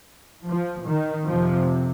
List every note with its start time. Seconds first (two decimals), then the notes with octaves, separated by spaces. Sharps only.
0.46 F3
0.86 D#3
1.27 F2 C3 F3